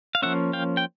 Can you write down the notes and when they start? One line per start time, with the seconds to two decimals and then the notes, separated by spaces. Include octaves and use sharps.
0.15 F5
0.22 F3 A#3 C#4 E5 F#5
0.53 F5 G5
0.77 G5